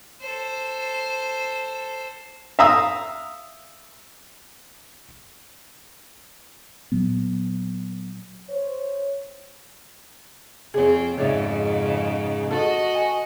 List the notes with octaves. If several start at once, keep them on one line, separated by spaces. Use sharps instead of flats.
A4 C5
E5 F5 A#5 D#6 E6
A#2 F#3 B3
C5 C#5
F2 C4 G#4 C#5
F2 G#2 C#3 C#5 D5 E5
F#4 A4 D#5
G#5